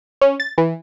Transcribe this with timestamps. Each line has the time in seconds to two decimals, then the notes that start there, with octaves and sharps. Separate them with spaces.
0.21 C#4
0.40 A6
0.58 E3